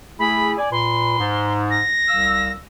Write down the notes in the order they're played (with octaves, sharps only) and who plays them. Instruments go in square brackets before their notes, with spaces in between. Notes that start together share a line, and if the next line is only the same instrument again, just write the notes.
[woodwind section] A3 E4 G#4 [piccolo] B5
[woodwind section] D5 G#5
[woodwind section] A#2 B4 [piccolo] C6
[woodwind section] G#2
[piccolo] A#6
[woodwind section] C2 F5 E6